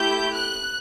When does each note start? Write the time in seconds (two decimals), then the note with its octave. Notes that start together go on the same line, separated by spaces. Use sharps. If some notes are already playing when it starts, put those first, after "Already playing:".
Already playing: A3 E4 G4 G6
0.34 F#6